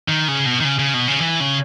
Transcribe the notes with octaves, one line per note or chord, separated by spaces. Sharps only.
D#3
C#3
B2
D#3
C#3
C#3
B2
C#3
E3
C#3